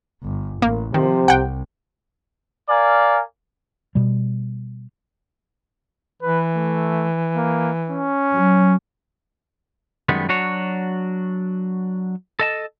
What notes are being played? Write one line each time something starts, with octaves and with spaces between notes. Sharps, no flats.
G1
A1 A#3
C3 D#3 F3
C2 F#5 G5
A#4 D5 F5 G#5
B2 G3
E3 B4
A3
A#3
C#4
F#3
F#2 D#3 G3 G#3 B3
F#3 D4 F#4 C#5
A4 D#5 A5